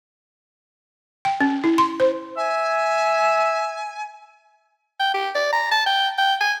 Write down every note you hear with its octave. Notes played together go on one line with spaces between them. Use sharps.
G5
C#4
E4
C6
C5
E5 G#5
G5
G4
D5
A#5
A5
G5
G5
G#5